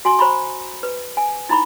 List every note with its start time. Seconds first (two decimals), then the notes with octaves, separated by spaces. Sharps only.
0.05 F#4 G#5 C6 C#6
0.19 C5 A#5 B5 C#6
0.83 B4
1.17 G#5
1.49 D#4 E4 A#5 B5 C#6